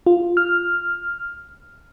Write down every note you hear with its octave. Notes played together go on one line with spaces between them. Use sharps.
F4
F6